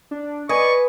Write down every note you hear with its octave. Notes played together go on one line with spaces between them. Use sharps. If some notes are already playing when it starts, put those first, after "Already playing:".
D4
B4 D5 D#5 G#5 C#6